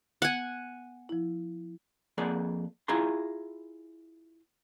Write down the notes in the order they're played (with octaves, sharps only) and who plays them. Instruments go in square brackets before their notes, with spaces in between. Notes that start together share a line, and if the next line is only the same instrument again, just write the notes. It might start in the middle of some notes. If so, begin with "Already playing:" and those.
[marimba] B3 [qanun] F#5 G#5
[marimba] F3 E4
[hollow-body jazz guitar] F2 A#3 G#4 D5 F#5
E4 F4 G#4 A#5 C6